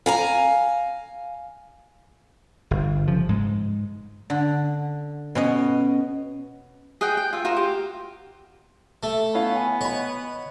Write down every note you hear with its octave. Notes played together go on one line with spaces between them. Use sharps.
F5 G#5 A#5
G1
C#3 F3
G#2 G#3
D3
B2 C#4 D#5
G#4 D#5 F#5 G5
G5
F4 E5
F4 F#4 A#4 C5
G4
A3
B3 C#4 E4 F5
G#5
C#5 D#5 B5